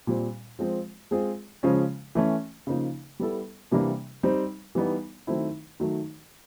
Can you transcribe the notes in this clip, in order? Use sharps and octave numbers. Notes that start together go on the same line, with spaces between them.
A#2 G3 C4
F3 G#3 C4
G#3 C4 F4 G#4
C#3 F3 G#3 C#4
E3 A3 C#4
C#3 F3 A#3 D#4
G3 B3 E4 A4
C3 E3 G3 A#3 D4
G3 C4 D#4
E3 G3 B3 D#4
D#3 F#3 A3 C4 E4
D#3 F#3 A3